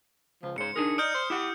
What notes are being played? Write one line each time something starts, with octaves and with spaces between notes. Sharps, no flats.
C#2 F3
G#2 C#3 C5 C#7
D4 D#4 G#4 A#4
D#4 D5 D#6 F6 G6
C5
E4 G4 F#5